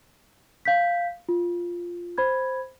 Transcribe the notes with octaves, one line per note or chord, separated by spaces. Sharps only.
F5 G6 B6
F4
C5 B5 G#6